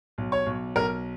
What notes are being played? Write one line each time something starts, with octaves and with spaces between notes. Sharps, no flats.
B1
C#5
B1
B1 A#4